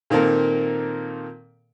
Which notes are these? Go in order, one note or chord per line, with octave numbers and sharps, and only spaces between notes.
A#2 D#3 A#3 C4 A4 A#4